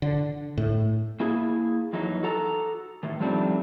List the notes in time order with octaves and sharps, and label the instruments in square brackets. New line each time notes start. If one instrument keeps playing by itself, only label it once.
[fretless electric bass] D3
A2
[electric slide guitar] A#3 E4 G#4
F2 E3 F#3 D#4
F#4 A4 A#5
A2 D#3
F3 G3 A3 C4 D4 D#4